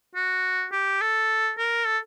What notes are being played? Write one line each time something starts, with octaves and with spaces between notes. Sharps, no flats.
F#4
G4
A4
A#4
A4